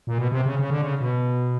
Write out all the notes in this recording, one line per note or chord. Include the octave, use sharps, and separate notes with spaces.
A#2
B2
C3
C#3
C#3
D3
C#3
B2